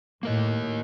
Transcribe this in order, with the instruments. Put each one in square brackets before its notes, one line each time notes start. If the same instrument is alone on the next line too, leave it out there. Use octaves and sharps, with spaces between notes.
[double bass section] A2 [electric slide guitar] A#3 A#4 D#5